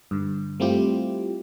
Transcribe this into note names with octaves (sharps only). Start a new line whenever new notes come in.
G2 D3
G3 A3 C4 E4 F4 G4